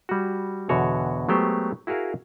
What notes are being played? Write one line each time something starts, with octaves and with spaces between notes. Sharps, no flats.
G3 F#4
E2 B2 D3 F#4 C#5
F#3 G#3 A3 B3 G4 C5
E4 F#4 G#4 A#4 F5